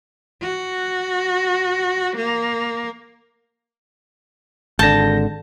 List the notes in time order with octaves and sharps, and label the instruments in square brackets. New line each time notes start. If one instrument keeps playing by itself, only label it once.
[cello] F#4
A#3
[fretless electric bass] G#1 D3 [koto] A5 [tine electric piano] G6 A#6